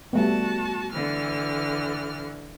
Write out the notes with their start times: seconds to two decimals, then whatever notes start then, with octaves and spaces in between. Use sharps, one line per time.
0.13 G3 A3 B3 F#4 A5
0.92 D3 E3 F6